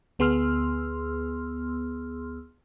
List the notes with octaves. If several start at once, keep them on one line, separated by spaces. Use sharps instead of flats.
D2 B3 G#4 C6 E6 F6